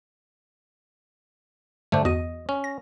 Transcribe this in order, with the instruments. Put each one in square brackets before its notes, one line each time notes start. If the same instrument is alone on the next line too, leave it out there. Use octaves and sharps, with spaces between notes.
[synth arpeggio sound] G2 D3 C5 [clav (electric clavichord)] A3 D4
[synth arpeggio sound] E2 F#4 D#7 [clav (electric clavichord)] D#5
[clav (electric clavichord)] C#4
[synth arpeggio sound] A#6